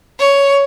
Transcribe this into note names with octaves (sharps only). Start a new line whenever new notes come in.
C#5